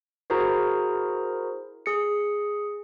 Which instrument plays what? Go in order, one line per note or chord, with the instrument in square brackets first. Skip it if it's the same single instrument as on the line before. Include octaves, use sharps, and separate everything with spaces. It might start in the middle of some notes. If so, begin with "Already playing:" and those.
[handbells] E4 F#4 G#4 A#4 C5 A#5
G#4 C#7